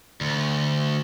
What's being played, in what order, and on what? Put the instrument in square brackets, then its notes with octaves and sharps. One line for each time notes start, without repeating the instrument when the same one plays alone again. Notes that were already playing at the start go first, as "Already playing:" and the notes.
[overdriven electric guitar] D2